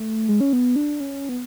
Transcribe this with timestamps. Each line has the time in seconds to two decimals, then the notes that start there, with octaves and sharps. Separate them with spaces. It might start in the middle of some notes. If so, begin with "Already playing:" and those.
Already playing: A3
0.29 G#3
0.41 C#4
0.53 B3
0.76 D4
1.00 C#4
1.29 B3